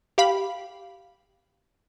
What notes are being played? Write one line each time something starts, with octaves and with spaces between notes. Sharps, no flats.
G4 F5 B5